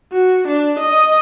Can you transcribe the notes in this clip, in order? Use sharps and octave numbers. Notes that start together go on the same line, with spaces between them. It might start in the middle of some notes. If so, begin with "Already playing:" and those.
F#4
D4
D#5